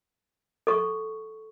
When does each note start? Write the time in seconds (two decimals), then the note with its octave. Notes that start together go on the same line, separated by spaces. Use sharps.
0.67 A4 C#6